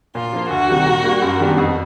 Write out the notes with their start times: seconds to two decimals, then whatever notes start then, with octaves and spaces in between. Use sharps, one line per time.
0.14 A#2 F4
0.33 F3 A#3
0.50 D2 F#4
0.69 C3 D#3 G3
0.86 A#2
1.04 G3 A#3
1.22 F#2
1.40 D#3 G3 B3 D4
1.58 F2